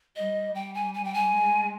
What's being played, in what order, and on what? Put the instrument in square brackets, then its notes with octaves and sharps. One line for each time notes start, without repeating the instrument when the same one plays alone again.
[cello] G3 [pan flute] D#5
[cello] G3 [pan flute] G5
[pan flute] G#5
G#5
G5
G#5
[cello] G#3